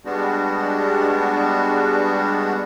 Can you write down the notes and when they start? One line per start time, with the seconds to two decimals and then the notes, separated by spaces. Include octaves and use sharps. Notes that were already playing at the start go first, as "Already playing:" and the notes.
0.05 G3 G#3 B3 D4 F#4